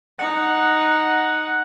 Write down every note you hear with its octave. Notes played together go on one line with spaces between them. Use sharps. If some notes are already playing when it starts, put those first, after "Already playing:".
D#4 F#5